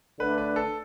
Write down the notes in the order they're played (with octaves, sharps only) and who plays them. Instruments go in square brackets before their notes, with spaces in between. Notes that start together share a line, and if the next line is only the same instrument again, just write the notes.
[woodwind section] D3 A3 D4 [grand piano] B4
[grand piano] B4
A4